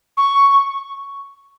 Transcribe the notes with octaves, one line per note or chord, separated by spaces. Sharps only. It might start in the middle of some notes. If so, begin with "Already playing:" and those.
C#6